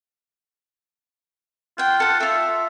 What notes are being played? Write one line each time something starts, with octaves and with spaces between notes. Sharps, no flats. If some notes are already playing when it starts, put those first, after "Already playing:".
F4 F#5 G5
A4 F#5
F4 A4 E5